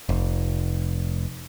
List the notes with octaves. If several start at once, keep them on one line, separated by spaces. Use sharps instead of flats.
F1